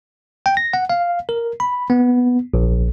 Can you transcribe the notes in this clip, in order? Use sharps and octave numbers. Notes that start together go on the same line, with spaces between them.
G5
A#6
F#5
F5
A#4
B5
B3
A#1